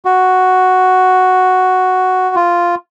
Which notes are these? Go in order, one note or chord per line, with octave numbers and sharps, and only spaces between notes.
F#4
F4